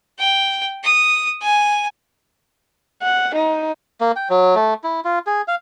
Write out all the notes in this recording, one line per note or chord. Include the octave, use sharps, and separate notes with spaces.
G5
D#6
G#5
F#5
D#4
A#3
G5
F#3
A3
E4
F4
G#4
F5